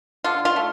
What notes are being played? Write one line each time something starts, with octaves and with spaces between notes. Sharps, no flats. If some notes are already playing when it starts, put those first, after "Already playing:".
D3 F4
F4
A3